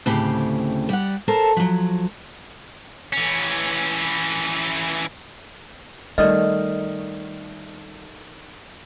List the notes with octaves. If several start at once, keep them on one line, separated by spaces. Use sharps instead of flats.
D2 A2 C#3 C4 G4
G3 F#5
A4 A#4 C5 A5
F3 F#3
E3 C#4
D#3 G3 A3 D5 D#5 D#6 F6